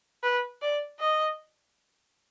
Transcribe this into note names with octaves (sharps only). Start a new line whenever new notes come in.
B4
D5
D#5